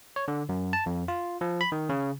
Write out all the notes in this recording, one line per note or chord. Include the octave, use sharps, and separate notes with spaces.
C#5
D3
F#2
A5
F2
F4
F3
B5
D#3
C#3